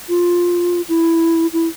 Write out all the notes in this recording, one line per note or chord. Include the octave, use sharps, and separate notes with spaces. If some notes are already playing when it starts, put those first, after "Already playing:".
F4
E4
E4